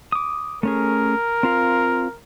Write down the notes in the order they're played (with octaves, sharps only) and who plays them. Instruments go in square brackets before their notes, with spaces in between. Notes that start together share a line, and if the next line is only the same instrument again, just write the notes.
[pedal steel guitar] D6 D#6
[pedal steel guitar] A3 C#4 G#4 [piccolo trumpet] A#4
[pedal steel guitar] C4 F4 F5